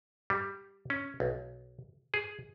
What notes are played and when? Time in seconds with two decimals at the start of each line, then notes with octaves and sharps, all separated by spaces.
0.30 G3
0.90 C#4
1.20 B1
2.14 G#4